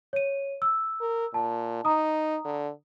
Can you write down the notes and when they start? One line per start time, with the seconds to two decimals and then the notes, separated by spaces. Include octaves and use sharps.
0.13 C#5 D#7
0.62 E6
1.01 A#4
1.34 A#2 A5
1.85 D#4 A#5 D#6
2.45 D3